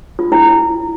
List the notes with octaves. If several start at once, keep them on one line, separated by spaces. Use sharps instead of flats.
F4
E4